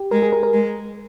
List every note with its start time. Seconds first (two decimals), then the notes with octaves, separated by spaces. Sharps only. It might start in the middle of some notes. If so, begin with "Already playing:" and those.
Already playing: G4
0.11 G#3 A#4
0.22 G#4
0.33 A#4
0.43 A#4
0.53 G#3